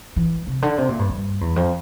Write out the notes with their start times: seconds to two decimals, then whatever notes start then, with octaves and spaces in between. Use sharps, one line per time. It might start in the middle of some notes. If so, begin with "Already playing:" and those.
0.16 E3
0.47 C3
0.62 D3
0.78 C3
0.89 A#2
0.99 G2
1.10 G2
1.41 E2
1.56 F2